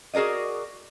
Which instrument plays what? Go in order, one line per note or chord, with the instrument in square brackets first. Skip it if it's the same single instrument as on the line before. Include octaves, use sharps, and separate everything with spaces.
[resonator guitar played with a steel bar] F#4 G#4 A#4 D5 D#5